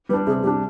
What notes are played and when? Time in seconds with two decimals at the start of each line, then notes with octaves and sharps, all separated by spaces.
0.09 G3 B4
0.13 D4
0.27 C3 G#4
0.44 G3 D4 G4